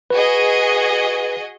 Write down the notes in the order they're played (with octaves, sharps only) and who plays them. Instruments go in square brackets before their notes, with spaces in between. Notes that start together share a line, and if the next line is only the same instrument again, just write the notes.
[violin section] F#4 G#4 D#5 [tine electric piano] B4